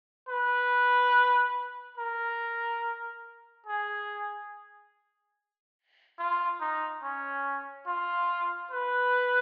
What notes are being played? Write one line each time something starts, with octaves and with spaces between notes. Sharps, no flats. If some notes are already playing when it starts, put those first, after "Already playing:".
B4
A#4
G#4
F4
D#4
C#4
F4
B4